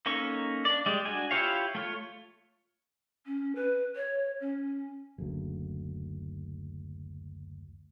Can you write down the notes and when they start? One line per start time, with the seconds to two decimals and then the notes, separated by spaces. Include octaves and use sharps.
0.06 A#3 C#4 D#4 A4 C#6
0.65 D4 D5
0.86 G3 G#3 D5
1.05 D4 F#4 G#5
1.31 E4 F4 G4 C#5 F5
1.75 A3 F4 C#5
3.26 C#4
3.55 B4
3.96 C#5
4.40 C#4
5.18 F#1 D2